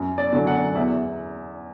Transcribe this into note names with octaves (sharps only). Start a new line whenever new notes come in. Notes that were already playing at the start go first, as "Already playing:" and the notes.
Already playing: F#2
D5
D3 F#3
F#5
E2 E5